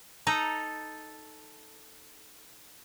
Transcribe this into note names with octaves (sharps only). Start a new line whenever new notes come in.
D#4 A4 A#5